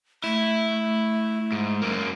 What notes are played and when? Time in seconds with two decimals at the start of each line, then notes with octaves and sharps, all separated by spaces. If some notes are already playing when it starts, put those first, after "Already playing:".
0.24 A3 E4
1.52 G#2
1.82 F#2 A#3